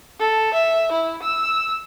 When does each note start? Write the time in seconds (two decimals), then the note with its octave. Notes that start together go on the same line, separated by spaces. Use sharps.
0.19 A4
0.54 E5
0.92 E4
1.22 E6